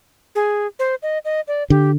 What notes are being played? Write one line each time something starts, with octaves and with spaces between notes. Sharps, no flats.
G#4
C5
D#5
D#5
D5
D3 G4